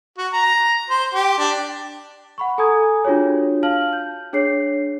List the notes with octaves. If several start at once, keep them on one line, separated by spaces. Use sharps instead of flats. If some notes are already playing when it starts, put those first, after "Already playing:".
F#4
A#5
C5
G4
D4
F#5 B5 C#6
A4 G#5 A#5 D#6 G#6
D4 F4 F#4 G#4 C#5
F5 A5 F6 F#7
G6
D4 G#4 C#5 C7